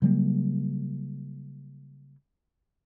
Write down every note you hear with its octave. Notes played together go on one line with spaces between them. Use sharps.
C#3 F#3 G3 A#3